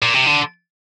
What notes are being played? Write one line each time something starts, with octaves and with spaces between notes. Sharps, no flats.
A#2
C3
D3